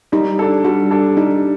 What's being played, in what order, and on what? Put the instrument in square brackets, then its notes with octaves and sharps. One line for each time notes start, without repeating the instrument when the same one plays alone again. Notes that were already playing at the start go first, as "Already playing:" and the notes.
[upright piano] G3 [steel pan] D#4
[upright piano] D4 A4
[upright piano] G3 [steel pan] F#4
[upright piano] D4 A4
[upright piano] G3 [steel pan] D#4